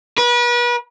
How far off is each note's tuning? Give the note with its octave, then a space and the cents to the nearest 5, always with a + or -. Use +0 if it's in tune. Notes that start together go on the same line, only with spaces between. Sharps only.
B4 -35